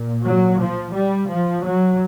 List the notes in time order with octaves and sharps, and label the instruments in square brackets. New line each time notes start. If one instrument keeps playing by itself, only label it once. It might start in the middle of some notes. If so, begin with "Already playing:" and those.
Already playing: [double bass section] A#2
F#3
F3
G3
F3
F#3